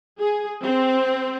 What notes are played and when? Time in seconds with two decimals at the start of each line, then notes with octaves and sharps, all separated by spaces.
0.20 G#4
0.64 C4